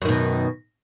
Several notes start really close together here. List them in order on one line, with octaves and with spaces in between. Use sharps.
F#2 D#3 B2